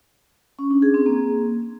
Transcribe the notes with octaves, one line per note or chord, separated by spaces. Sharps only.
C#4
D4
G#4
C4
A#3